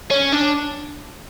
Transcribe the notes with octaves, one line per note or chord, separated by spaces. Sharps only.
C#4
D4